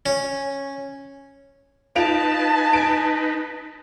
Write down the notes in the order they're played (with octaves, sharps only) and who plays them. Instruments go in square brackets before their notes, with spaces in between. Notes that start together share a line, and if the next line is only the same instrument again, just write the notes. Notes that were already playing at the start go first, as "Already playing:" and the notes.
[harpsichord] C#4
[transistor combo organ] D#4 B4 [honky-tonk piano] F4 D7 F7 [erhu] A5
[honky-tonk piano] D7